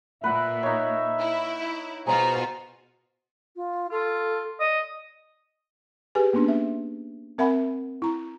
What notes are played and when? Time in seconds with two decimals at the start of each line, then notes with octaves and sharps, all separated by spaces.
0.24 A#2 B4 E5 F#5
0.63 D#4 C#5
1.19 E4
2.07 B2 F4 F#4 G#4 C5 A#5
3.56 F4
3.91 F4 A4
4.60 D5 D#5
6.15 G4 G#4 B4 G#5
6.33 A#3 B3 C#4 D4
6.48 E5
7.38 C4 A#4 E5 F#5 G#5 B5
8.02 E4 A#5